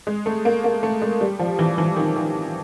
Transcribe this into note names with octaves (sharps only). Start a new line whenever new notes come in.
G#3
A3
A#3
A#3
A3
G#3
G3
F3
E3
E3
D#3
D#3